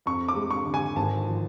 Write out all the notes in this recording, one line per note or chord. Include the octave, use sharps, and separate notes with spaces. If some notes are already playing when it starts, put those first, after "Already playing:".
F2 C#6
D6
G#3
C#6
D3
G#5
G#1 A5
F3